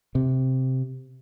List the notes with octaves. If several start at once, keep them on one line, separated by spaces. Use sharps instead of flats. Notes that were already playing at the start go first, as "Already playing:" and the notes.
C3